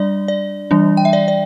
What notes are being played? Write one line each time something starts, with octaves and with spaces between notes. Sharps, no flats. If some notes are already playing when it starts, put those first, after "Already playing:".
Already playing: G3 D4 D5
D5
E3 G3 D4
G5
E5
D5
D5